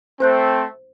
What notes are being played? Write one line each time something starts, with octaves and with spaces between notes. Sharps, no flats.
A3 C4 C5 F#6 G6